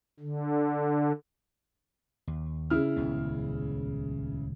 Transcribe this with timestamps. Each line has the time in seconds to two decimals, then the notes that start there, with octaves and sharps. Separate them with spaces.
0.20 D3
2.27 D#2
2.70 C#3 E4 F6
2.97 D#1 C#2 B3